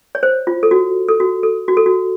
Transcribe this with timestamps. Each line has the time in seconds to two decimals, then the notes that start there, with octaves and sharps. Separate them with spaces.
0.15 C#5
0.23 C5
0.47 F4
0.63 A4
0.71 F#4
1.08 A4
1.20 F#4
1.43 A4
1.68 F#4
1.77 A4
1.86 F#4